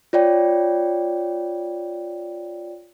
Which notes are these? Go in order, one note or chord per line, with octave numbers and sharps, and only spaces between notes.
F4 C#5 D5 G5